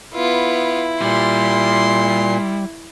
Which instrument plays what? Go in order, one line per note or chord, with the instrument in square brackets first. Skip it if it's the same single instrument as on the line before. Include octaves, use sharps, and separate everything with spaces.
[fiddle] B3 F4 [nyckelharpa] E4
[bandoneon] A#2 [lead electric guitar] G3 [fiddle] C6